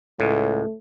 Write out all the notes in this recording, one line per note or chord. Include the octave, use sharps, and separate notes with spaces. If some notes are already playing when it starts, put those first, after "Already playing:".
C#2 A2 A3